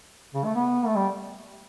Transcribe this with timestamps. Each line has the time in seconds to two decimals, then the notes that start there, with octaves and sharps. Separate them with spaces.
0.35 C#3
0.45 A3
0.55 B3
0.86 A3
0.96 G3